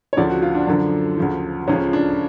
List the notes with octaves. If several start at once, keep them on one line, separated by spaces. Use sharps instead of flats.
C#5
D2 C#3 F3 D5
F#4
F4
D4
F#2 D3 F3
D2 C#3 F3
C#2 C#3 F3 C#4
D4